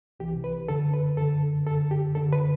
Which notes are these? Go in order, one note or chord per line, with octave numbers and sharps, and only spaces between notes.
C2 C3 E3 G4
B4
F#2 D3 A4
B4
F#2 D3 A4
F#2 D3 A4
G4
F#2 D3 A4
B4